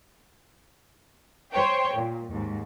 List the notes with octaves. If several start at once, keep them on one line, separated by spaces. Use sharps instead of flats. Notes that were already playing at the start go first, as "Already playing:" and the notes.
C5 C#5 G5
A#2
D#2 G#2